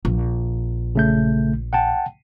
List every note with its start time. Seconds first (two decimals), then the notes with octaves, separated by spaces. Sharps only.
0.05 A#1
0.95 C#3 A3 G6
1.73 F#5 G5 A5